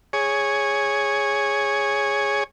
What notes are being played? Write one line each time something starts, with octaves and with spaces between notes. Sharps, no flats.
G#4 C#5